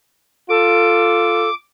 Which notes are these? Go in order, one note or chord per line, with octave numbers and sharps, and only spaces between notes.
F4 A4 D6